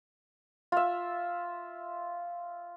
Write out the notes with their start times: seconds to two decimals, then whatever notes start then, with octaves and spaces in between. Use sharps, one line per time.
0.72 F4 E5